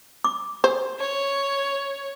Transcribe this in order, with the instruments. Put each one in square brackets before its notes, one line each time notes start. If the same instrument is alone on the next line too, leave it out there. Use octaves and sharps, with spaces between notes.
[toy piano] D6
[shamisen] C5
[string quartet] C#5